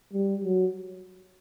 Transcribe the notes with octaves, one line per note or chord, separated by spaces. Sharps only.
G3
F#3